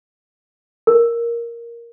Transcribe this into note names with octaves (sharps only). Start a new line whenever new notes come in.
A#4